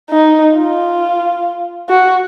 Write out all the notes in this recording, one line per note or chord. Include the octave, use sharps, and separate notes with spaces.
D#4
F4
F#4